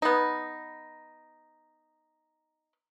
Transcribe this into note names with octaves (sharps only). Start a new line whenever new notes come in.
B3 D#4